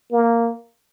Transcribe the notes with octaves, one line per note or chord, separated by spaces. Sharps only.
A#3